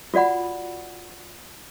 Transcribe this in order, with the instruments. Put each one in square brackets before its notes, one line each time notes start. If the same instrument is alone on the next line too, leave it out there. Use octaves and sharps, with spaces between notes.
[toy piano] F4 F#4 D5 F#5 B5